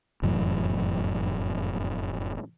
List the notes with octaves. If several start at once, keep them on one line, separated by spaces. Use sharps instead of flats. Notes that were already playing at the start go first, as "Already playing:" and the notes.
F1 F#2 A2 E3